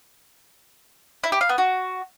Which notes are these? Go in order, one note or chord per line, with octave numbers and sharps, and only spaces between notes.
E4
G4
F5
B3
F#4